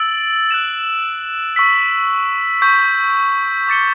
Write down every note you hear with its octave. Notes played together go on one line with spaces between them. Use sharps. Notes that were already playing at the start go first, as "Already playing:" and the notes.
Already playing: E6 A6 D7 F#7
F#6 A6 E7
C#6 E6 B6
C#6 G6 B6
D6 A6 C#7 G7